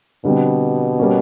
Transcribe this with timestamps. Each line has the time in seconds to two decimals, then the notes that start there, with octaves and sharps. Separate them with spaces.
0.25 B2 D3 G3 C4
0.99 G3 A#3 C#4